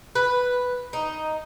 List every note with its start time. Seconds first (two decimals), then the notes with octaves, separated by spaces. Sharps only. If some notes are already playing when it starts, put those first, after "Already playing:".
0.15 B4
0.93 D#4